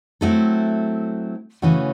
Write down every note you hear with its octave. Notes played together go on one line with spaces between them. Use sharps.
F#3 A3 C4 E4 A4
C#3 E3 A3 C#4 F#4